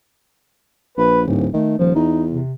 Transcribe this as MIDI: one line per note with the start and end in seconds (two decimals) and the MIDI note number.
0.98 1.22 34
0.98 1.21 71
1.27 1.48 26
1.27 1.47 44
1.54 1.78 51
1.54 1.75 57
1.79 1.91 27
1.79 1.93 53
1.95 2.39 40
1.95 2.24 63
2.30 2.54 48